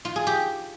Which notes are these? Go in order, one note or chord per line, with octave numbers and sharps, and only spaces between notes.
F4
G#4
G4